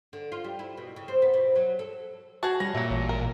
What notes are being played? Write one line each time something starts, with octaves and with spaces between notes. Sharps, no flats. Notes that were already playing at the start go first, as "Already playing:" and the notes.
D3
F4
G3
E4
B2
C#3
C4
B3
B2
F#3
A4
F#4 G#4 A5
G3 C#4 A#6
A#2 F#3 A3
A1
A#4